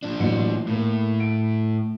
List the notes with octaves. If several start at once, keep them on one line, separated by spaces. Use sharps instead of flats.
A#2 D4
A1 F#3 C#7
A2 A#3 A#4
D7